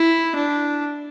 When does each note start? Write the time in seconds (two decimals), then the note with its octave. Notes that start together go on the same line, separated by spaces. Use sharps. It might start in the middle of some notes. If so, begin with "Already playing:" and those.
Already playing: E4
0.35 D4